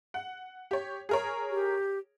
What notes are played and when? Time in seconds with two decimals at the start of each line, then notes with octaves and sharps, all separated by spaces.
0.14 F#5
0.71 G4 C#5
1.09 G#4 A#4 C#5
1.51 G4